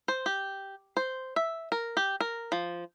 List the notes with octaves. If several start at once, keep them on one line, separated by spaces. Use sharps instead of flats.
C5
G4
C5
E5
A#4
G4
A#4
F3